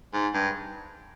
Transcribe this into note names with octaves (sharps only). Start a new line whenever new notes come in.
G#2
G2